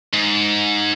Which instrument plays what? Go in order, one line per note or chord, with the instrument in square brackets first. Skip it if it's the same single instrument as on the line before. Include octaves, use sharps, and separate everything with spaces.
[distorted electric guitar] G#2